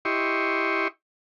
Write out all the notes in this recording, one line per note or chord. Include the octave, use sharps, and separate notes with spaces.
E4 G4 D#5 C6 C#6